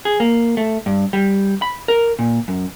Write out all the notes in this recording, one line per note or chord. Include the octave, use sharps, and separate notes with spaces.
G#4
A#3
A3
G2
G3
B5
A#4
A#2
F#2